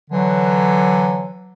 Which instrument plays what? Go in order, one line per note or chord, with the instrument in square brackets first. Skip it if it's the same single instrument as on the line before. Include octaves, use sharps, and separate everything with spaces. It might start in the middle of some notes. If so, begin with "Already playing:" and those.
[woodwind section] D3 E3 F#3